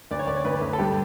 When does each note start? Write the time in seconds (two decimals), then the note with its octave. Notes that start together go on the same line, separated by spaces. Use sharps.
0.11 D2 D5
0.19 C#5
0.27 D2 D5
0.36 C#5
0.45 D2 B4
0.61 D2
0.73 A4
0.78 G2 G4